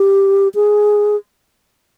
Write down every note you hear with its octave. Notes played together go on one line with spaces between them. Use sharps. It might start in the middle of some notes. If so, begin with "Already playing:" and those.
Already playing: G4
G#4